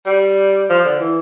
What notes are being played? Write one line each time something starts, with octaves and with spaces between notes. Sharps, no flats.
G3
F3
D3
E3